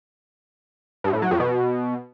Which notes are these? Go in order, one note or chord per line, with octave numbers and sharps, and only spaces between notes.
G2
A2
F#3
F2
B2